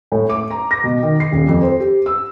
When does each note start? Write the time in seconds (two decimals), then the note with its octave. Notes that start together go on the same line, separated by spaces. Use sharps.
0.12 A2
0.29 D6
0.50 A#5
0.71 A#6
0.84 B2
1.03 D#3
1.20 C7
1.32 D#1
1.48 F2
1.62 C5
1.80 G4
2.06 E6